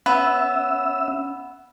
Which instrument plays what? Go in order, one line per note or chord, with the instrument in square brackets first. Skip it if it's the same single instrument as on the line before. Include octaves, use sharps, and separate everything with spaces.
[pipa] B3 [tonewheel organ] C#4 E5 E6